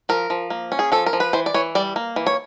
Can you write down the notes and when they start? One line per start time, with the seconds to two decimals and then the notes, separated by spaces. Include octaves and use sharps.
0.09 F3 A#4
0.30 F3
0.50 A#3
0.72 C#4
0.79 G#4
0.92 F3 A4
1.06 A#4
1.13 F3
1.20 B4
1.33 E3 C5
1.46 D5
1.54 E3 C#5
1.75 G3 D5
1.96 A#3
2.16 E3
2.26 C#5